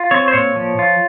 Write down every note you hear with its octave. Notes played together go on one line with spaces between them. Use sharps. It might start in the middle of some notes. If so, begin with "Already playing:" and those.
Already playing: F4
C4 C#5
C5
A#2 C#5
F3
F4